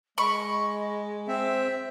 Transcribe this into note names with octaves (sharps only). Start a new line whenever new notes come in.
G#3 D#5 B5 C#6
C4 C5 E5